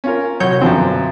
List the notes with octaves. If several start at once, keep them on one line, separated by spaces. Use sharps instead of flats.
C#4 F4 A#4
C2 F#3 F#4 C#5 G6
B1 F#2 D3 F3 C4